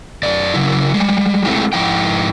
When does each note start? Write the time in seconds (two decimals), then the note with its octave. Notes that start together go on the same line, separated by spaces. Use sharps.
0.23 F#2 D5
0.54 C#3 F#3 E4
0.94 G3 G#3
1.45 G#3 A3 C4 D#4 E4 G4
1.73 G#2 F3 E4 G5